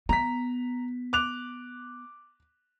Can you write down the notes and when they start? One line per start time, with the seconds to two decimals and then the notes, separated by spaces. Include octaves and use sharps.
0.09 B3 A#5 B6
1.13 D6 F#6 F7